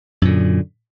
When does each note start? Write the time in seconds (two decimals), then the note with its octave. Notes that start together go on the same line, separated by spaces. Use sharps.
0.22 F#2
0.25 A#2
0.28 D3